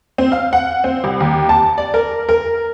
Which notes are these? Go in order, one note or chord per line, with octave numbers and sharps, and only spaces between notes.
C4
F5
F#5
C4
C2
D#2
A5
D5
A#4
A#4